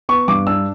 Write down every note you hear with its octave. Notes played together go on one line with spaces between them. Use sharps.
B3 C#6
G2 D6
D4 E6